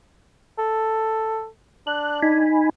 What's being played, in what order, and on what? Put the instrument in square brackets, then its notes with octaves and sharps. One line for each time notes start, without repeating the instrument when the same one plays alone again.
[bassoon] A4
[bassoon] D4 [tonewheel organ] F#6
[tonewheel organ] D#4 G#5 B5